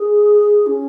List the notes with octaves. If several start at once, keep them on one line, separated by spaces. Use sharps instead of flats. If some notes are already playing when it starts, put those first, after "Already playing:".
Already playing: G#4
C#4